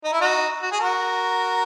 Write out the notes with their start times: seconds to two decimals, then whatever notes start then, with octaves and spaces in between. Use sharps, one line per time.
0.04 D#4
0.12 E4
0.20 D#4 F#4
0.62 F#4
0.71 G#4
0.80 F#4 A#4